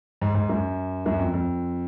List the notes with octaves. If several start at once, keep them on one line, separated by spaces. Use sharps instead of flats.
G#2
G#2
F#2
F#2
F2
F2